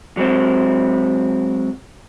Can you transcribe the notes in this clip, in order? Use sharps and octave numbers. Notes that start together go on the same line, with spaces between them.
F#3 G#3 C4